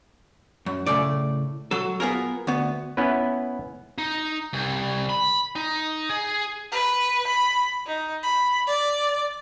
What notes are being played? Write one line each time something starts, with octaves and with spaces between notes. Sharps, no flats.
F#2
A2 C#3 A3 D5
F#3 A4
B3 F4 G#4 A#4
D2 B3
B3 C#4 E4 B4
D#4
C2
B5
D#4
G#4
B4
B5
D#4
B5
D5